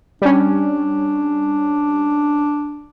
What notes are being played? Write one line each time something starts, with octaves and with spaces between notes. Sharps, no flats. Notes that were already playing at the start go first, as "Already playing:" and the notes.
G3 C#4 D4